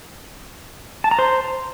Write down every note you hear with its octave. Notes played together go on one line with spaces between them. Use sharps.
A5
A#5
C5